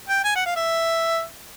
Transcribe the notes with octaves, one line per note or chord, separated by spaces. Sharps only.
G5
G#5
F#5
F5
E5